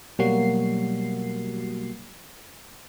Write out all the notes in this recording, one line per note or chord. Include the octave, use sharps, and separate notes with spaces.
B2 F#3 G3 A#3 F#4 C7